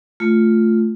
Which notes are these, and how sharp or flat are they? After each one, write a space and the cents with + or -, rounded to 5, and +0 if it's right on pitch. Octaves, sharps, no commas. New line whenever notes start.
A3 +0 F4 +0